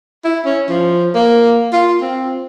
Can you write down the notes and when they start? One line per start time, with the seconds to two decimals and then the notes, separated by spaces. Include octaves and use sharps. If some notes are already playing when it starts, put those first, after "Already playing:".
0.25 E4
0.45 C#4
0.69 F3
1.15 A#3
1.72 F4
2.01 C4